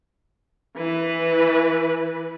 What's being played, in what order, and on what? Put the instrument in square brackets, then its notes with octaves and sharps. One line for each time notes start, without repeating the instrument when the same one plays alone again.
[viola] E3 B4